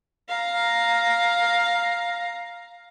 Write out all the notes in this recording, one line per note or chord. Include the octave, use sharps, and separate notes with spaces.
F5 A#5